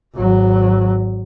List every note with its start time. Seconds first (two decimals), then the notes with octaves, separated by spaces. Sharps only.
0.15 G#1 F#3